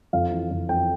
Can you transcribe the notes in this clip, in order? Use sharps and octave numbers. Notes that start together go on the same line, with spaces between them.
F2 F5
E3
F2
F2 G5